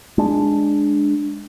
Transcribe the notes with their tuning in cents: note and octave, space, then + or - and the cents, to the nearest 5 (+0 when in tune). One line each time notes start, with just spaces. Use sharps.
G#3 +0 D4 +0